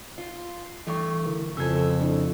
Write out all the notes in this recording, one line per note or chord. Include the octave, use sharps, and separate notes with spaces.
F4
G2 E3 A3 C#6
D3 E4 A#4
F2 C#3 A4 E6 G#6
D4 E4